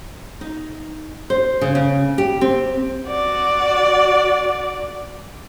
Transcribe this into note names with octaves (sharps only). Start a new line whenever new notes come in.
D#4
C5
C#3
C#3
G4
C4
F#4 D5